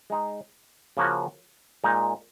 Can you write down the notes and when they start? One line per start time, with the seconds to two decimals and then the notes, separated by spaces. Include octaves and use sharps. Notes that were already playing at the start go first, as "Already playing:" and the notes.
0.10 G#3 D#4 G#4
0.97 C#3 F3 A#3 C#4 F#4
1.84 A#2 G#3 D#4